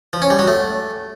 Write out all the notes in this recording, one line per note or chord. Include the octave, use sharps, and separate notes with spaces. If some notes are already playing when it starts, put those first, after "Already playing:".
F3
C#4
G3
F#3
A3